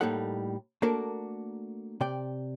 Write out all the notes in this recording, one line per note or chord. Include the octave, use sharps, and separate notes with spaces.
A2 G3 A#3 D#4 A4 F#5
A3 A#3 D4 F#4 A4 A#4
C3 D5 G5